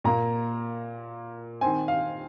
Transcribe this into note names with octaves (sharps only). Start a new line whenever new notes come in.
A#2 A#3 A#5
D#3 C4 G#5
F5